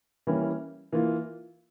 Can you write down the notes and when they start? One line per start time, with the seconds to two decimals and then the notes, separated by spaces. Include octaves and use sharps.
0.27 E3 G3 A#3 C#4 E4
0.92 E3 A#3 F4